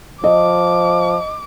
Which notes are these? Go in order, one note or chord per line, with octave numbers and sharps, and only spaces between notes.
F3 D#5 D6